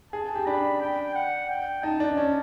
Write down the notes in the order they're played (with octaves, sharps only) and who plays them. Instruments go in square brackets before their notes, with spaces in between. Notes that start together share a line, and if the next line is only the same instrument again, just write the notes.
[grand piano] G#4 [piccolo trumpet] A5
[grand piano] G4
[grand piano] D4 [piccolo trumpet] B5
[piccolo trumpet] G5
F#5
G5
[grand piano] D#4 [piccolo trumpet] A5
[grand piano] D4
C#4